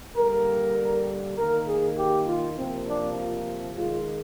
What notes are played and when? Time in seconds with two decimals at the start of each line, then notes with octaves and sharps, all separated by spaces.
0.16 D3 G3 A#3 A#4
1.35 D#3 A#3 A#4
1.66 G#4
1.96 G4
2.26 F4
2.56 C3 F3 A#3 C4
2.86 D4
3.16 F4
3.75 D#3 G#3 F4